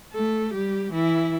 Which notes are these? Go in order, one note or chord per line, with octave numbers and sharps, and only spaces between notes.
A3 A4
G3 G4
E3 E4